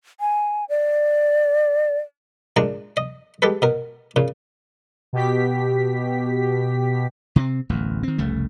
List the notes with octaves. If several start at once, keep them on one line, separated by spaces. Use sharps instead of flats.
G#5
D5
A#2 G#3 D4 A#5
D#5
G#3 G4 A4 B4
B2 A#4
A#2 C#3
B2 G4 B6
C3 B3 C4
D1 A1 E2
D#3 C4
F1 C2 C#3 A3